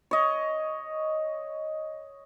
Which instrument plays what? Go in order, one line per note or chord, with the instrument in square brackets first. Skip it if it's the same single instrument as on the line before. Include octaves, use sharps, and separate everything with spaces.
[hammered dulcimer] C#5 D#5